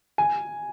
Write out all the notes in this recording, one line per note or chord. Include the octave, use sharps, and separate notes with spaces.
G#5